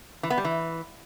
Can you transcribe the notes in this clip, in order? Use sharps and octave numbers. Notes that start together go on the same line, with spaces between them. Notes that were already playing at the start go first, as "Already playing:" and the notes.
E3
B3
G3
E3